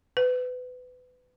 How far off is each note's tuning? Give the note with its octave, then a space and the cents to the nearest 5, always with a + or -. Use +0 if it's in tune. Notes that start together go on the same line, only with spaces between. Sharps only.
B4 +25